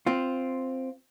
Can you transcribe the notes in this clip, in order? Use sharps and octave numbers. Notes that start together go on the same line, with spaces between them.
C4 F4